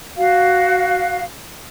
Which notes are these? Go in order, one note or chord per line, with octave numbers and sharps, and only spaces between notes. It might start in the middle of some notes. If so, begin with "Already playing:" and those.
F#4 F5